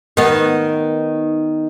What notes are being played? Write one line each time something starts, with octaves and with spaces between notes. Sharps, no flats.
D#3 B3